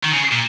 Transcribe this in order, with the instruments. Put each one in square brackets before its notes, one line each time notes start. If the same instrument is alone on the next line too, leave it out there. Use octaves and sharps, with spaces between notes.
[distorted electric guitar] D#3
C#3
A#2